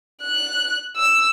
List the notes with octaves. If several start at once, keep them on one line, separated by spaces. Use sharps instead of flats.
F#6
E6